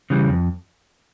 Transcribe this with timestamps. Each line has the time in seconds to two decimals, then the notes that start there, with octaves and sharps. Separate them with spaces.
0.10 C#3 E3 G3
0.29 F2